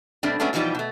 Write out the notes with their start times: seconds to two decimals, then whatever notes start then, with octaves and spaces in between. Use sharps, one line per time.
0.23 B2 G3 A3 C4 D4
0.40 F#3 G#3 A3 B3 C#4 D4
0.53 B2 E3 F3 G3 D#4 G4
0.75 B2 A3